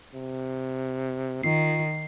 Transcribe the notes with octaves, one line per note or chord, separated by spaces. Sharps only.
C3
D#3 F4 C7